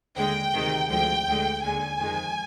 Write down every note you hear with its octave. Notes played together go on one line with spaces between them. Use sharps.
D#2 D3 G#3 G5
D2 C3 D#3 G#3
D2 D3 F3 G#3 G5
D2 D3 G#3
D#2 D3 G#3 G#5
F2 D#3 G#3